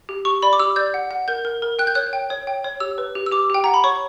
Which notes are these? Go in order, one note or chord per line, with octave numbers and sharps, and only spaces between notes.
G4
G4 C#6
D5 B5
D6
G4 E6
D5 G6
F#5
F#5
A#4 G6
A#4
A#4
G5 F#6
G6
C#5 F#6
G5
C#5
G5
C#5
G4 E6
B4
G4
E6
G4 D6
G4 G5
F#5 A#5
B5
C#5 C#6